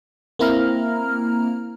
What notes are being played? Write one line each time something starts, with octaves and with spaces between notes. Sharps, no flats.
A#3 C4 E4 A#5 F6